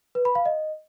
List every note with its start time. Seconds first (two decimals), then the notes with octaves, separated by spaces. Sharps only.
0.15 B4
0.25 B5
0.35 F5
0.46 D#5